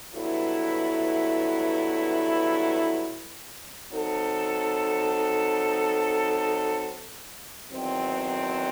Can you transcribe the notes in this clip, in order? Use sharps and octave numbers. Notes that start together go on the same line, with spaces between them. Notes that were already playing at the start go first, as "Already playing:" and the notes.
G2 F#3 B3 E4 A4
F#3 C4 D#4 A4
E2 D#3 F#3 C4